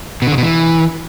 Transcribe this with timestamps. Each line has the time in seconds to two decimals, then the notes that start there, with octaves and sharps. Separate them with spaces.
0.22 B2
0.27 D3
0.32 C#3
0.38 B2
0.43 E3